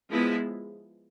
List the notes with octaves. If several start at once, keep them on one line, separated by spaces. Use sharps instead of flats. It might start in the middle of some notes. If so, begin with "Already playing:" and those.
F3 G#3 B3 E4